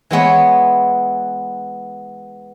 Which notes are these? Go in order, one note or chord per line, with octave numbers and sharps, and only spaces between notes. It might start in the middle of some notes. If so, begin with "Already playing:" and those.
E3 G#3 B3 C#5